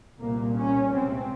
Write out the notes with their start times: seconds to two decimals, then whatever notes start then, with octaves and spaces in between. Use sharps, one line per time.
0.19 C2 A#2 A#3
0.56 C#4
0.93 C#2 C3 C4